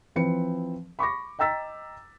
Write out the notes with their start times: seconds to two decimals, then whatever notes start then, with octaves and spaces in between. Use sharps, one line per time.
0.16 E3 F3 C4 B4 C#7
0.99 B5 C#6 D6 A#6
1.39 D#5 G5 A#5 E6 A6 B6